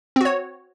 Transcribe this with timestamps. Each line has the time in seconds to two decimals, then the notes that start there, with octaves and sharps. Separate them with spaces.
0.16 C4
0.21 F#4
0.25 C#5